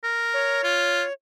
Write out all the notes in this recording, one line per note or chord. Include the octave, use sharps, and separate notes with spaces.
A#4
C#5
F4